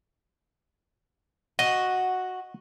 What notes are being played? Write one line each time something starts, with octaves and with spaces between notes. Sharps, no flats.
F#4 D#5